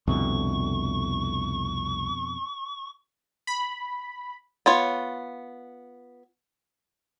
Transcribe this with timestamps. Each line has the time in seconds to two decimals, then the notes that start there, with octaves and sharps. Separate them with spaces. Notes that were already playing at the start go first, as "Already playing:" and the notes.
0.08 C2 F2 B2 D3 C#6
3.47 B5
4.66 B3 F4 C#5